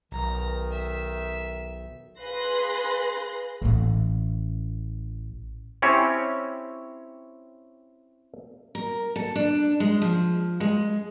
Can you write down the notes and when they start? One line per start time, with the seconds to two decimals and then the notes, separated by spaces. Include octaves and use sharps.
0.12 B1 D#3 A#5
0.72 E5
2.20 G#4 B4 F5 C6 F#6 A#6
3.62 A1 C#4
5.82 C4 C#4 E4 G4 C#5
8.75 A#4
9.16 A4
9.36 D4
9.80 G#3
10.02 F3
10.60 G#3